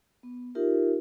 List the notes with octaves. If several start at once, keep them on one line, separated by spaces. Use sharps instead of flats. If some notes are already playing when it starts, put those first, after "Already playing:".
B3
D#4 F4 G4 A#4 E5